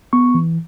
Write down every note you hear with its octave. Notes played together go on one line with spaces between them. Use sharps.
B3 C#6
E3